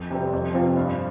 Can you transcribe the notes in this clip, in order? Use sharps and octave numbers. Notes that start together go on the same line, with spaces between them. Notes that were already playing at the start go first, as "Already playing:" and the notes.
Already playing: F2
C3 G3 C4
F2
C3 F3 C4 F4
G2